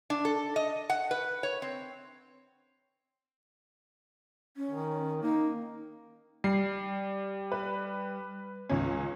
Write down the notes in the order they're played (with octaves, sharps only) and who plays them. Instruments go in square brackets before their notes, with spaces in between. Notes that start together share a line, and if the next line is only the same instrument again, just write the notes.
[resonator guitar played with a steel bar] D4
A4
D#5
F#5
B4
C#5
C4
[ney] C#4
[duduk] D#3
[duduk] A#3 [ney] D#4
[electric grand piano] G3 [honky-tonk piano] C7
[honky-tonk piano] B4
C#2 C#4